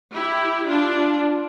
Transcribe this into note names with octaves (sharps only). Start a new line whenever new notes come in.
E4 G4
D4 F4